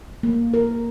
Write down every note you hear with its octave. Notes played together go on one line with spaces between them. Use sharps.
A#3
A#4